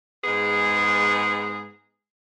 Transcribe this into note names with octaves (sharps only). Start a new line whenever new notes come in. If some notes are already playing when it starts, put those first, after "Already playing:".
G#2 G#3 B3 G#4